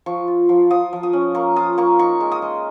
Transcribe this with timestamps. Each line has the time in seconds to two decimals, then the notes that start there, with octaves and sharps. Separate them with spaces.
0.06 F3 C#6
0.28 F4
0.49 F3
0.70 F3 D#6
0.93 F3
1.03 D#6
1.13 C#4
1.35 A#3 C#6
1.56 F4 D#6
1.78 A#3 C#6
1.99 D#4 C#6
2.20 G#3
2.32 D#6
2.42 G#3